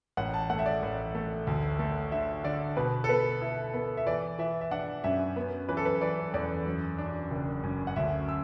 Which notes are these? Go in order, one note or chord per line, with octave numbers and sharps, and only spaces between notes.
A1 F#5
A5
A3 F#5
E5
D5
A1
A3
D2
A3
D3 E5
D3 D5
B2 B4
A4
B3 B4
E4
B3
E5
E3 D5
E3 E5
E5
D4 F#5
F#2 E5
B3
E3 B4
A4
B4
E3 D5
E2 D5
F#2
D4
F#1
F#2
F#5
D2 E5
E6